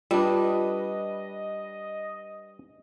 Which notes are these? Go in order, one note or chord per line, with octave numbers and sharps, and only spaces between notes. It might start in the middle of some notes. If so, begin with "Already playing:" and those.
G3 D4 F4 B4 D#5